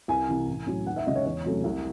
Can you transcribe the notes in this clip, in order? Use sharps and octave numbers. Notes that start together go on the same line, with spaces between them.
C2 G#5
C3 E3
A1
A2 F#3 C#4
D#2 F#5
E5
C#3 G#3 C#4 D#5
C#5
E2 C#5
C3 F#3 A3 C#4
C2